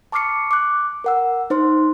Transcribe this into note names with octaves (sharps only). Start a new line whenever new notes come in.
A5 C#6 D6 F6 C7 C#7
D6 F#6
A#4 F#5 E6
D#4 C5 C6